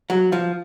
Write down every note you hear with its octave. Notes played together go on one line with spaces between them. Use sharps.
F#3
F3